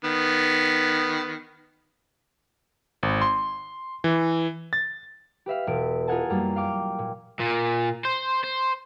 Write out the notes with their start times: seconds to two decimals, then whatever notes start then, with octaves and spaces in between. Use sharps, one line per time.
0.04 D#3 B3
3.03 G#1
3.21 C6
4.04 E3
4.73 A6
5.46 G4 B4 E5 F5
5.67 E1 B2 D7
6.08 F4 G#4 A#4 F#5 G#5 A5
6.30 F#2 G3 A#3
6.56 F5 G5 D6 F6
6.99 A#2
7.40 A#2
8.05 C5
8.44 C5